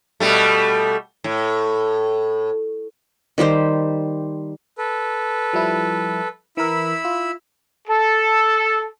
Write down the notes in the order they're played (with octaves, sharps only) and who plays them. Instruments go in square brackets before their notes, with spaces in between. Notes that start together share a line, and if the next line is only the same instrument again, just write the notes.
[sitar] B2 G3 A3
A2
[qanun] D#3 G3 G4 C5
[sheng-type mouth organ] A4 B4
[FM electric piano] F3 G3 E4
[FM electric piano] E3 A#4 [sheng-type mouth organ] E4 B5 E6
[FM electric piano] F4
[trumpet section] A4